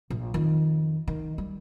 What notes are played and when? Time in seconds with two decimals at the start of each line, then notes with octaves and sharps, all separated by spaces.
0.10 A#1
0.34 F2 D#3
1.08 D#3
1.38 G3